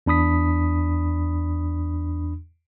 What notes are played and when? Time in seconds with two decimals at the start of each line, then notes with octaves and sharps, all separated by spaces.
0.06 E2 D4 B5 D#6 B6